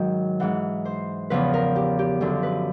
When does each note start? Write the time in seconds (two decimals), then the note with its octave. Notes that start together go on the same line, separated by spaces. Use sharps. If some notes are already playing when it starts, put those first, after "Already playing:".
Already playing: G#2 D#3 F#3 G5
0.40 G#2 E3 F#5
0.85 C5
1.30 E2 C#3 F3 B4
1.53 A#4
1.76 G4
1.99 G4
2.21 F#2 D3 F3 A4
2.43 B4